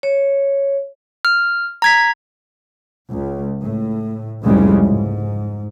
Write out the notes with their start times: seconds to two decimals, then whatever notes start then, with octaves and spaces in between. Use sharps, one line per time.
0.03 C#5
1.25 F6
1.82 A#5 G#6 B6
3.09 C#2
3.63 A2
4.44 F1 C2 G#2 C#3 G3 G#3
4.83 G#2